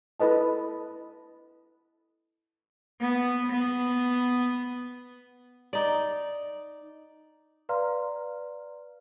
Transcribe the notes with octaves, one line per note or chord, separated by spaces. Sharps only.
E4 A4 B4 D#5 A5
B3
B3
D#4 D5
B4 D5 F5 A#5 C6 F6